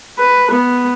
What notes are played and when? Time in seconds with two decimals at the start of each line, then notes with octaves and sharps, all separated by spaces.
0.19 B4
0.51 B3